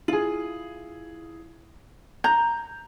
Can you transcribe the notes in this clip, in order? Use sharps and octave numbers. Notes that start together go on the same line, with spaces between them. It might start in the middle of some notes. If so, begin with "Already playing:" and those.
E4 F4 G#4
A#5 G6